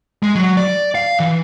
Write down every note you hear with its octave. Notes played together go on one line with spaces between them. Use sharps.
G#3
F#3
D5
F5
E3